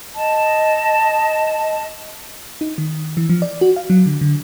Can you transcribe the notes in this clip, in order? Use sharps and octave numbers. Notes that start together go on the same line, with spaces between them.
D#5 A5
D#4
D#3
E3
F3
D5
F#4
F5
F#3
D3
D3